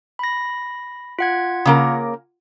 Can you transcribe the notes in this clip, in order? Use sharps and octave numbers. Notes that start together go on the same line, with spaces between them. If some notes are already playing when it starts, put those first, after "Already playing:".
B5 A#6
F4 F#5 G#6
C#3 A#3 A#4